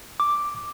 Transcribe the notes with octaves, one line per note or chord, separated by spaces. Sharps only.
D6